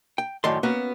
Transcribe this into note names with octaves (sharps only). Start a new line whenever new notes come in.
G5
F#2 A2 D#3 C#5 D5 C6
A#3 B3 C#4 F#4